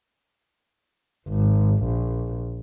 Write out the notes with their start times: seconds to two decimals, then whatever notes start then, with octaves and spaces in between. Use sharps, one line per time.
1.29 G#1
1.84 A#1